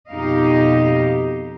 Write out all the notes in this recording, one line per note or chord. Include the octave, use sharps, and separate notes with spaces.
F2 B2 D#4 G4 D#5 F5